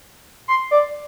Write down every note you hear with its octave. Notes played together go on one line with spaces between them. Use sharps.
C6
D5